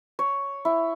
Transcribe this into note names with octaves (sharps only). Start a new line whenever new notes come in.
C#5
E4